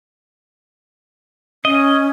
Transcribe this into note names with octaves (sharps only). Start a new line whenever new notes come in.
C#4 D#5